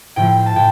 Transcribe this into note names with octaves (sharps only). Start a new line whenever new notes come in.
A2 F3 C4 G5
G5
A5
A2 G5